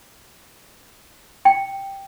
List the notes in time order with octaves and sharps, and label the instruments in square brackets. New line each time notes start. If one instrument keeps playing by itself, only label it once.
[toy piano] G5